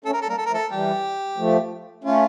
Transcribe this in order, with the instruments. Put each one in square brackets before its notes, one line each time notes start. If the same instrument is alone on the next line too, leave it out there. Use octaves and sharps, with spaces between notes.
[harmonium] A3 C#4 [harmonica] A4
[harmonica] A#4
A4
[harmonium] G3 A#3 [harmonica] A#4
[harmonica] A4
A#4
[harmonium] F3 A3
[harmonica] A4
[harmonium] E3 G3 [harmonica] G4
[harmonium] F3 A3
[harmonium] A3 C#4 [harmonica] F4